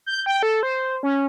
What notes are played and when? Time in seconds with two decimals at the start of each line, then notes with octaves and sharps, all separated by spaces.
0.06 G6
0.26 G5
0.43 A4
0.63 C5
1.03 C#4